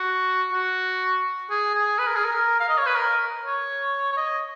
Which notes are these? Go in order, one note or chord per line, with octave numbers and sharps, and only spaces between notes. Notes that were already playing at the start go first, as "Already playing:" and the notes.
Already playing: F#4
F#4
G#4
G#4
B4
A#4
G#4
A#4
F5
D#5
C#5
B4
A#4
C#5
C#5
D#5